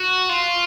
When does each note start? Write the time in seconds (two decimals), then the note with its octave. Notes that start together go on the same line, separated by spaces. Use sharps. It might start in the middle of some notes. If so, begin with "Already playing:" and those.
Already playing: F#4
0.29 F4